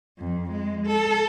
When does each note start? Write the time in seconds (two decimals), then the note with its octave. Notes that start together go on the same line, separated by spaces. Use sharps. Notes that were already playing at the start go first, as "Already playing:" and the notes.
0.17 F2
0.51 G#3
0.85 A4